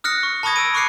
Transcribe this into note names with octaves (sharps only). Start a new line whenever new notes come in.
D#6 F6 F#6 A#6 C#7
C#6
A5 B5 C#6 D#6 G#6 A#6
E6 D7 D#7
B5 C#6 D6 F#6 C7 C#7